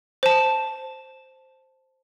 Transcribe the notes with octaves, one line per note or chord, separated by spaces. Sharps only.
C5 A5